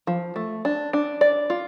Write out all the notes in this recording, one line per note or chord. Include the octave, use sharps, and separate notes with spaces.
F3
A3
D4
D4
D5
F4